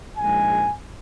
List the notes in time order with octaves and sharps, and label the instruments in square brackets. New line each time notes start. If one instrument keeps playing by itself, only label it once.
[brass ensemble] A#1 G#2 G#3 G#5